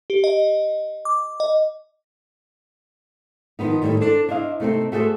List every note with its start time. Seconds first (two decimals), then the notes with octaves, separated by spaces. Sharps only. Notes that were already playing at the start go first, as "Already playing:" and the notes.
0.10 G4
0.24 D#5
1.05 D6
1.40 D#5
3.59 D#3 F3 B3 D#4
3.82 A2 D#3 G3
4.01 D4 A4 C5
4.28 D4 E4 C5 D#5 F5
4.60 C3 A3 C4 D#4
4.92 A3 F#4 G#4 A4 C5